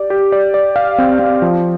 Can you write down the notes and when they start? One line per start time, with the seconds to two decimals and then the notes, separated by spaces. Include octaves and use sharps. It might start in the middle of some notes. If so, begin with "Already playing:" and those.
Already playing: G4 D5
0.10 G4
0.32 D5
0.54 D5
0.76 F5
0.98 C4
1.19 C4
1.42 F3